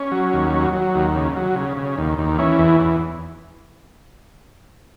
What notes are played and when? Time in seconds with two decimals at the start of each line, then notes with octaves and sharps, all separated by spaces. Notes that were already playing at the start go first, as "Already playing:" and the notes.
Already playing: C#4
0.12 F#3
0.33 D#2
0.54 F#3
0.73 F#3
0.95 D#2
1.15 C#3
1.36 F#3
1.56 C#3
1.77 C#3
1.98 D#2
2.18 D#2
2.38 E3 C#4
2.59 E2
2.80 E2